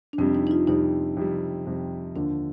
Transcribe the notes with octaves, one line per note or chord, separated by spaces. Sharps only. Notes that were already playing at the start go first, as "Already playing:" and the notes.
D4
F2 C3 G3 C4
D#4
D#4
F4
F2 C3 G3 D#4
F2 C3 G3
F2 C3 G3
D#2 D3 F3 D4